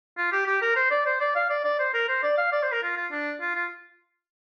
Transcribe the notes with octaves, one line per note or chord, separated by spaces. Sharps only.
F4
G4
G4
A#4
C5
D5
C5
D5
F5
D5
D5
C5
A#4
C5
D5
F5
D5
C5
A#4
F4
F4
D4
F4
F4